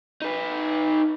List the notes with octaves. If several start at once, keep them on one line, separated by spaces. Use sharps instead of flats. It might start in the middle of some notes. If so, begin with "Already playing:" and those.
D#4 B4